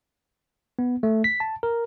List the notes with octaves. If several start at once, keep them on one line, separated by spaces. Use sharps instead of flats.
B3
A3
B6
A5
A#4